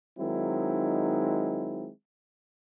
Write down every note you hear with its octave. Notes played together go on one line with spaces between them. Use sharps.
D#3 F#3 G#3 C4 D#4 E4